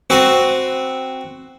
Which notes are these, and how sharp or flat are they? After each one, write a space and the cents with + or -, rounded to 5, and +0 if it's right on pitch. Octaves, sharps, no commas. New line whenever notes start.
C4 +0 F#4 +0 B4 +15